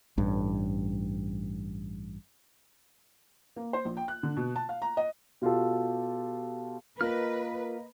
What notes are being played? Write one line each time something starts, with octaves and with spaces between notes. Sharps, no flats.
A1 G2
A#3
C5
A#1
G5
F#6
D3
B2
A5
F5
A#5
D#5
B2 F4 G4 A4
A#3 F4 A#4 B4 D#5 F6